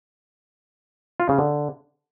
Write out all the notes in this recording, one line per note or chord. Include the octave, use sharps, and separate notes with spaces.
F4
C#3
D3